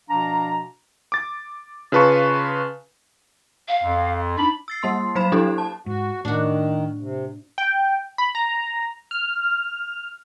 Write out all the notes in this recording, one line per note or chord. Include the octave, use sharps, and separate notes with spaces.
B2 F3 D4 F5 A#5
D6 A6
C#3 F4 B4 A5 C#6
F5
F2
D4 D#4 B5
E6 A6 C7
G3 A#3 C6 C7
F#3 C5 B5 E7
F#3 D4 E4 G4 A4
A5
G#2 F#4
A2 D#3 D4 F#4
C3
G5
B5
A#5
F6